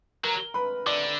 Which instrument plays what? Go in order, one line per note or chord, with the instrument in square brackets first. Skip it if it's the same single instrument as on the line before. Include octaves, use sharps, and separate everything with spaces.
[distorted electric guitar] F#3 [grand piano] A#4 A#5
[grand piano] B4 B5
[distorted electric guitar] D3 [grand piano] D5 D6